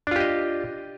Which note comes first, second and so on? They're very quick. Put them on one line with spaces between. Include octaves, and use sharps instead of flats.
D4 F4 G4 D#5